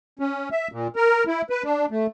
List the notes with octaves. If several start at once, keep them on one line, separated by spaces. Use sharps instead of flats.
C#4
E5
A#2
A#4
E4
B4
D4
A3